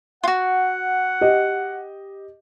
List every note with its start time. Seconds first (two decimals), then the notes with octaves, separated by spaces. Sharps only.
0.24 F4 F#4 F#5
1.21 G4 D#5